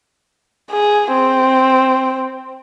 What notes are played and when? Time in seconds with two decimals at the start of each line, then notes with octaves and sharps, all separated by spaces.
0.71 G#4
1.13 C4